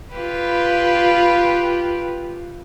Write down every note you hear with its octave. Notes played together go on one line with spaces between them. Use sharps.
F4 G4 B4